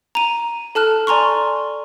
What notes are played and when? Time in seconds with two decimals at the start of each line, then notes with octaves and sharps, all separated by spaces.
0.15 A#5 D#7
0.75 A4 A5 F6 F#6
1.07 D5 G#5 A#5 C6 C#6